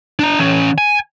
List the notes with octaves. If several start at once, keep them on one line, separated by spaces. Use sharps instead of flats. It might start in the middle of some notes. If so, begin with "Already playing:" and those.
D4 A#5
E3 C#4
G#5